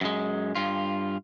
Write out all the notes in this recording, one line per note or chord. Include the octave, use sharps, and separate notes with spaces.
F#2 G#3
G2 F4